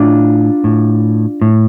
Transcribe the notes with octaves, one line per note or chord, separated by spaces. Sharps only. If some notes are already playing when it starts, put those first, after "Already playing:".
Already playing: A2 D4 F4
A2
A2